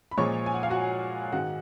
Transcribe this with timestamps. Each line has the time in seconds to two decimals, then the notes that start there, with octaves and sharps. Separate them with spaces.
0.11 B5
0.17 A#2 F3 G#3 C#5 C#6
0.46 G#5
0.54 F#5
0.63 F5
0.70 F#4 F#5
1.32 G#2 D#3 G#3 F#4 F#5